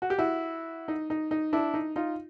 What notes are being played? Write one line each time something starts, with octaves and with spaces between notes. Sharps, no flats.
F#4
G4
E4 F#4
D#4
D#4
D#4
D4 E4
D#4
D#4 F4